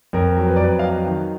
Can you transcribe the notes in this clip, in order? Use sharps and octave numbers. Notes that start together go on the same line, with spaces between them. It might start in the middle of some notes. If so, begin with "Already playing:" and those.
F2 A#4
F#3
B4
D5
F2 B4
F5
F#3 D#5
D#3